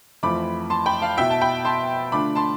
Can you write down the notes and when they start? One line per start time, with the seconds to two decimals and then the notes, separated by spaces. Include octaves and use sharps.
0.23 F2 E3 A3 C4 F4 B5 D6
0.70 A5 C6
0.86 G5 B5
1.02 F5 A5
1.17 B2 B3 E4 E5 G5
1.30 A5
1.41 G5 B5
1.65 A5 C6
2.12 D3 A3 D4 F4 B5 D6
2.35 A5 C6